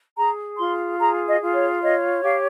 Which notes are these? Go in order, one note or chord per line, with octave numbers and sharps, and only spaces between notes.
G#4 A#5
F4 C6
G#4 A#5
D#5
F4
C#5
C#5 D#5
G4 F5